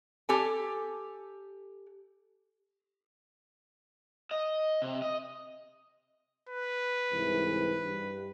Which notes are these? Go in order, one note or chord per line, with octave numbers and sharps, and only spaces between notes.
G4 A4 G#5
D#5
C3
D#5
B4
C2 G#2 E3
G2